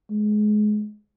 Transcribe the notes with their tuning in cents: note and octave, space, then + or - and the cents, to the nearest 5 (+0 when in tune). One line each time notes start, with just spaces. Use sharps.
G#3 +25